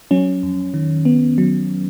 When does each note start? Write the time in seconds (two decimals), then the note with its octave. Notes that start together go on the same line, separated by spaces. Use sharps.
0.11 F#3 C#4
0.43 F2
0.74 D#3
1.05 B3
1.38 F#3